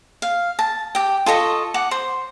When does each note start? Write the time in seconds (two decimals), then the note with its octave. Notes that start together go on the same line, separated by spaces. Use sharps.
0.22 F5
0.59 A5
0.95 G4 G5
1.26 F4 A4 D#5 C#6
1.74 F#5 D6
1.91 C5